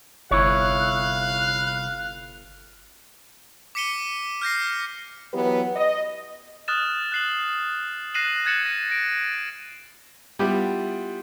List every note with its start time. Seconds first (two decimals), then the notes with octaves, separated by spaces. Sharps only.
0.31 G1 C2 E4 C#5 F5 F#6
3.75 D6 B6 C#7 D#7 G7
4.42 F6 G6 A#6 C7
5.33 E3 F#3 B3 G4 B4
5.76 D#5
6.68 D#6 F6 F#6 A6 E7
7.12 F#6 C7 F#7
8.14 F#6 A#6 C7 D#7 E7 F#7
8.45 F#6 G#6 A6 C#7 E7 F#7
8.65 A#6 D#7
8.90 A6 A#6 D7
10.39 G3 B3 E4 F4 G4